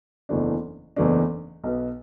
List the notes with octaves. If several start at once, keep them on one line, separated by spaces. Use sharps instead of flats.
F#1 E2 E3 A3 D4
F#1 E2 E3 A3 D4
B1 B2 B3